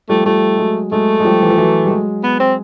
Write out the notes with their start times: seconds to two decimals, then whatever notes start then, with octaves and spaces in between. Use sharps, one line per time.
0.10 F3 G3 A3
0.26 F3 G3 A3
0.58 F#3 G#3
0.92 F#3 G#3 A3
1.20 G#3
1.25 F3 G3
1.42 E3
1.50 F3
1.57 E3 F#3
1.86 G3
1.90 F#3 G#3
2.23 B3
2.40 C4